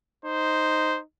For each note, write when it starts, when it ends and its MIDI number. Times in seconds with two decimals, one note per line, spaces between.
0.25 1.03 63
0.25 0.99 72